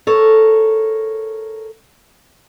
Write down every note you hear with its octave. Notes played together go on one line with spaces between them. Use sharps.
A4 A#4 C#5